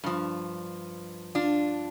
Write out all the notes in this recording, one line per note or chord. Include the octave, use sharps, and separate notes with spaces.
G2 F3
D4 F4